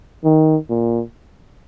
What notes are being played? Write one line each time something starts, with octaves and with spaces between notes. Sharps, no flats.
D#3
A#2